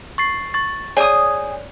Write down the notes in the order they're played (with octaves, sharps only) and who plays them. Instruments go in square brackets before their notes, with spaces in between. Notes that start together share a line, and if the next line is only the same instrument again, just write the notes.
[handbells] C#6 A6 C7
C#6 A6
[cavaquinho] G#4 D#6 [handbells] C#5 D5